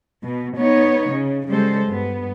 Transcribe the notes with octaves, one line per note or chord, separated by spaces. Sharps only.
B2
B3 D#4 C#5
C#3
C#3 G3 G#3 A4 C5
G2 B3